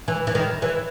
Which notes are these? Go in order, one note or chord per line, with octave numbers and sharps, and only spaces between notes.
E3
E3
D#3
E3